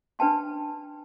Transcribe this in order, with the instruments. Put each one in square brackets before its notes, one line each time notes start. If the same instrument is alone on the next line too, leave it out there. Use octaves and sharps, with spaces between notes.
[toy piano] D4 B4 G5 A5 C6